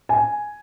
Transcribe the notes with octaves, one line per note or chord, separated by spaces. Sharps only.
G#5